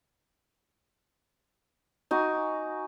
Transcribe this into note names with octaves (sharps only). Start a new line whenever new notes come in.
D#4 F#4 G#5 D6